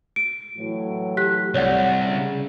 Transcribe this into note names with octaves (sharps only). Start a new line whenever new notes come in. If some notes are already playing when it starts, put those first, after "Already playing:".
D7
A2 E3 F#3
G4 F#6 B6
C2 C#5 D5 F#5
C#3